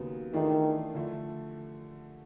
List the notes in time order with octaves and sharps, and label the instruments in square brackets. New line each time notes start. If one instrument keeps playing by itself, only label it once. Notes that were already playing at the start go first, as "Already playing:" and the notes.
Already playing: [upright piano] D#2 C#3 F#3 B3
[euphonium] D#3 [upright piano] E3 A3 D4 F4 G#4
[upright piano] D3 F3 A3